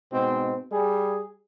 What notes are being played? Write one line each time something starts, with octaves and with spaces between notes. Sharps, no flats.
G#2 B2 C4
G3 G#4